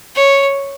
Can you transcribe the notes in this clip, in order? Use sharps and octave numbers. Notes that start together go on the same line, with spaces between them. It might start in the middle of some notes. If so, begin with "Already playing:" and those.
C#5